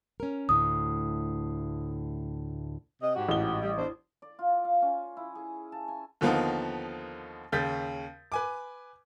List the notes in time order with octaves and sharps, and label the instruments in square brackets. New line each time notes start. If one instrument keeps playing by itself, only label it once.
[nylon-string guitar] C#4 A#4
[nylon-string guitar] D2 A2 [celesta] D#6
[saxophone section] C3 D#5
G#2 F#4 G4
[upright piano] A1 G7
[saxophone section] G3
E2 D4 C5
[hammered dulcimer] D5
F4
F5
C#4
E4
G#4
A5
G#5
[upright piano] D#2 D3 F3 A#3 B3 D#4
D#2 C#3 G6 A6 B6
B4 G#5 D6